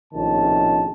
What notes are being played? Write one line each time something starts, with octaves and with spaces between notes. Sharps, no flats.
A#1 A2 C3 D#3 C#4 A5